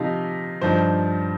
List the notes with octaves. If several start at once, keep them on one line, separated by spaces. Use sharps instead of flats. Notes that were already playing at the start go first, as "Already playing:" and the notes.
Already playing: C3 F3 D#4 F5
G2 F3 D#4 C5